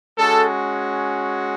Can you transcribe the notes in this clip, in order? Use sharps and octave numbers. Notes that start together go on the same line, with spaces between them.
G#3 C#4 F#4 A4